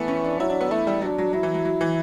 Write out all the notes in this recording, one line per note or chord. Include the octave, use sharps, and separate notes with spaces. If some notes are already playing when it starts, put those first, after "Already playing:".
Already playing: E3 A3 B3
C#4
D4
F#3 E4
D4
B3
A3 E4
G3
F#3 D4
F#3
F#3 E4
E3
F#3
F#3
E3